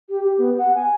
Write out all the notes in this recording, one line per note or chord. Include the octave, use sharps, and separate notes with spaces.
G4
G4
B3
F#5
G#5